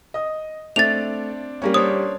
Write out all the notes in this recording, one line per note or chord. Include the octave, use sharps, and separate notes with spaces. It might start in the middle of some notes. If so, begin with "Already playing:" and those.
D#5 D#6
A3 C4 D4 D5 A6 F7
G3 A#3 C#4
D4 C5 C#5 D#6